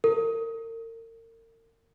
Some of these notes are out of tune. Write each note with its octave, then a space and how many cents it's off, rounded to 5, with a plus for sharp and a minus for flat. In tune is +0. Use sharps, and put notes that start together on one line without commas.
A#4 -40